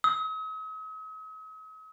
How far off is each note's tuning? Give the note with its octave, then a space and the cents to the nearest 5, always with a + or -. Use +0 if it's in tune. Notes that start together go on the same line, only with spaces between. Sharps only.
D#6 +45